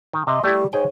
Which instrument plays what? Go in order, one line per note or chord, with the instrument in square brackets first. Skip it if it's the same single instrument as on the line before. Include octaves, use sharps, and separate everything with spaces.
[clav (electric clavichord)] D#3
[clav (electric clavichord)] C3 [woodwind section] D#5 E5 C6
[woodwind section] G3 [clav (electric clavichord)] A3 E4 [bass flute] G4
[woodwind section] G#2 [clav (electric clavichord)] G#4 G5 [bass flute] C#5